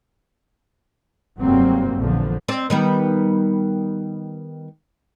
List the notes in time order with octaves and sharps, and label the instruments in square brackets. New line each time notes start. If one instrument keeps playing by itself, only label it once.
[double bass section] F1 G2 F#3 G3 A#3 C4
A#1 E2 D3 F3
[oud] C4 D5
D#3 G3 B3